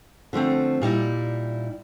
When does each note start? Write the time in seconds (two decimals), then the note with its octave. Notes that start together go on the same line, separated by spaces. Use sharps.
0.33 D3 F3 A3 C4
0.82 A#2 G3 D#4 E4